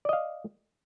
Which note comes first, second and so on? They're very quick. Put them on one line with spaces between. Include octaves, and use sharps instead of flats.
D5 D#5 F5